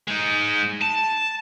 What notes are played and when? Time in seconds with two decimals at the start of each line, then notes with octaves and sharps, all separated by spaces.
0.08 G#3 D#4
0.81 A5